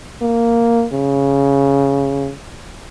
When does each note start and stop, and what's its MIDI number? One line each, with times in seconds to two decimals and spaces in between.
0.22 0.86 58
0.92 2.31 49